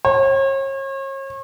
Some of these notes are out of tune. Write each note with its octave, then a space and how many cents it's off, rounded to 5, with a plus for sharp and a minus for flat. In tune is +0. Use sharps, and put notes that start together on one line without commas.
C#5 -40